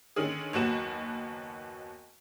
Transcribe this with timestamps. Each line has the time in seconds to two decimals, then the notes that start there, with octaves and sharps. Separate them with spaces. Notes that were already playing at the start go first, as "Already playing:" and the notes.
0.16 D3 D#3 C#4 G#4
0.53 F#1 D#2 F#3 B3 F#4 E7